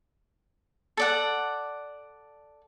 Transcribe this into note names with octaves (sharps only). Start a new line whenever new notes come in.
A4 D5 F#5